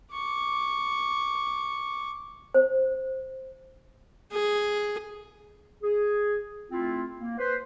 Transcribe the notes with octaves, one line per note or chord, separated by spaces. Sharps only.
C#6 D6
C5
G#4
G#4
A3 C4 E4 F4
A#3
B4 C5